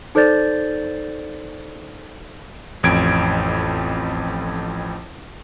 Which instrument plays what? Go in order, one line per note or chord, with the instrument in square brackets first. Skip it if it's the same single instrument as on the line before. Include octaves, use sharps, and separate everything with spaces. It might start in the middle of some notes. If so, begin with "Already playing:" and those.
[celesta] D#4 A4 C5 D5 G6 A6
[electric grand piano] A1 F2 G#6 D7